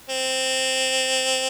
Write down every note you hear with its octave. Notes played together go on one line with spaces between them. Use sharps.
C4